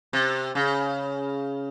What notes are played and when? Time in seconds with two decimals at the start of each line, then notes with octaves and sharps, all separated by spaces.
0.13 C3
0.55 C#3